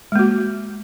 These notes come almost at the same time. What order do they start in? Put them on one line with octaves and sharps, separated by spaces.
G#3 A#3 F#4